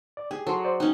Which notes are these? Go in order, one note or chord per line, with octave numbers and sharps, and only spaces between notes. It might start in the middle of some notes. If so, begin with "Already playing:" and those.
D5
G4 G#4
F#3 A4 C6
C5 D5
C#4 D#4 G5